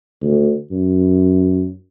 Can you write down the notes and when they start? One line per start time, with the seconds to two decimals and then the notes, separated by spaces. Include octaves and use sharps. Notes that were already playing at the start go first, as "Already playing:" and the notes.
0.21 D2
0.71 F#2